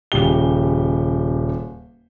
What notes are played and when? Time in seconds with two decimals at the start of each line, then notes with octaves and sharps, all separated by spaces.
0.12 D#1 C#3 G4 G7